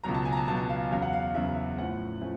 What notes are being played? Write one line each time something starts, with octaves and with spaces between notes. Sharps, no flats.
C#2 B2 F#3 A#5
A5
G#5
A#5
A5
C#2 B2 F#3 A5
F5
E2 C#3 F#3 F5
F#5
F5
E2 C#3 F#3 E5
E5
A2 F3 A3 C#4 F#5
F3 A3 C#4